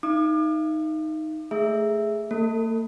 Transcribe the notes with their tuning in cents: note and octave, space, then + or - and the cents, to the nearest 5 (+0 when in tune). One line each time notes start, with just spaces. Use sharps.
D#4 +5 F5 -45 D6 +40
A3 +0 G#4 +0 E5 +0
A#3 -45 A4 +35